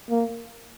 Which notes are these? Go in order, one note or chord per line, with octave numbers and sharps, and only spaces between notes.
A#3